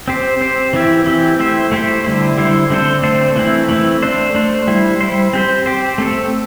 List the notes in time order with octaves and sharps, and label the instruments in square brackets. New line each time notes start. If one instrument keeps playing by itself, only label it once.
[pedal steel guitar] C4 G4 C5
C4 G4 C5
E3 C4 E4 G4
E3 C4 E4 G4
A3 E4 G4 C5
A3 E4 G4 C5
D3 G3 E4 C5
D3 G3 E4 C5
D3 A3 C4 A4 C5
D3 A3 C4 A4 C5
E3 A3 C4 E4
E3 A3 C4 E4
A3 D4 C5
A3 D4 C5
G3 E4 C5
G3 E4 C5
C4 G4 C5
C4 G4 C5
A3 C4 A4